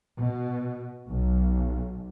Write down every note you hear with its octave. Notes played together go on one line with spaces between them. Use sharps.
B2
B1